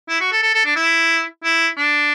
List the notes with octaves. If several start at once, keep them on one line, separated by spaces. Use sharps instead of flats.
E4
F#4
A4
A4
A4
D4
E4
E4
D4